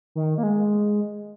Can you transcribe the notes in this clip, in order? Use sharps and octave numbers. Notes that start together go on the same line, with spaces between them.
D#3
A#3
G#3